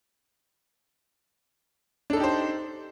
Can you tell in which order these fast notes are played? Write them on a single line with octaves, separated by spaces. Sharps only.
D4 A4 D#4 G4 C5